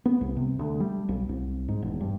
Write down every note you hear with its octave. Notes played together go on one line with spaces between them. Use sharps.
B3
C2
C3
D2
G3
B1
C2
G#2
E1
G2